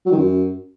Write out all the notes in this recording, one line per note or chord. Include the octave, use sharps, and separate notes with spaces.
F#3
D#3
F#2